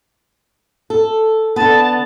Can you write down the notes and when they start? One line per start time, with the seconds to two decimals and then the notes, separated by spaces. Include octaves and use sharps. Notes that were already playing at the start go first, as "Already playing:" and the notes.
0.90 A4
1.56 D3 B3 A5